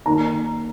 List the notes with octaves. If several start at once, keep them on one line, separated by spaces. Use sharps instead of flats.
D#3 A#3 A#5